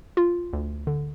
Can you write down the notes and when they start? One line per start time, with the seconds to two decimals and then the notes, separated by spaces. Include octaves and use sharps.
0.17 F4
0.53 D2
0.87 D3